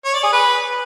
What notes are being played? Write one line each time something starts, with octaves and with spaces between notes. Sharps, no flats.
C#5
D5
G#4
B4